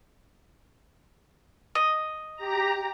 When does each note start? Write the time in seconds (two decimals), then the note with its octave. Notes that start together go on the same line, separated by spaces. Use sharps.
1.75 D#5
2.36 G4 A#5